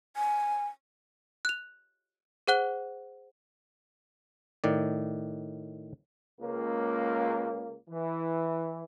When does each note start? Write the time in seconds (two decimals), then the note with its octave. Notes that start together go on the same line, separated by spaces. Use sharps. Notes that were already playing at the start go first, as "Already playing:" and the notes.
0.17 G#5
1.45 F#6 F7
2.47 G#4 C5 F#5 F#6 G7
4.64 A2 D#3 D5
6.40 C#2 A#3
7.89 E3